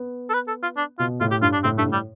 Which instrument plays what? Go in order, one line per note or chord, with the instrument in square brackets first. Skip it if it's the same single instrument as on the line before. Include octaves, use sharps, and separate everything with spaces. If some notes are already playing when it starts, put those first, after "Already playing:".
Already playing: [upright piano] B3
[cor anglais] A4
B4
A4
F4
D4
[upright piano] B2 [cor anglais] F4
[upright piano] A2 [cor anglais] F4
[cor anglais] G4
[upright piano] G2 [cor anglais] F4
[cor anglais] D4
[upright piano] A2 [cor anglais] C4
[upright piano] G2 [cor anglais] A3
[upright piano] A2
[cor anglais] G3